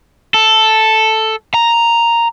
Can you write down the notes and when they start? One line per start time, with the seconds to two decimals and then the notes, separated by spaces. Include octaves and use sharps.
0.34 A4
1.54 A#5